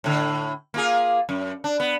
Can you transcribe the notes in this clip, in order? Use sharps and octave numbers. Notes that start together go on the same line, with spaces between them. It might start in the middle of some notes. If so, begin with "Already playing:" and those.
A2 D3
A#3 F4 G#4
F#2
D4
B3